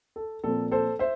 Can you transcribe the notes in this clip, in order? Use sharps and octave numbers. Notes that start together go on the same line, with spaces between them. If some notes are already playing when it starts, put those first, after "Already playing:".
A4
A#2 F3 C4 A4
A4 C5
C5 E5